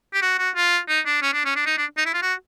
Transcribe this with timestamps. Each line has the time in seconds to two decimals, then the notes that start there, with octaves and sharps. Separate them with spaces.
0.14 G4
0.22 F#4
0.39 F#4
0.55 F4
0.89 D#4
1.06 D4
1.22 C#4
1.33 D4
1.45 C#4
1.56 D4
1.66 D#4
1.78 D4
1.97 D#4
2.06 E4
2.14 F4
2.22 F#4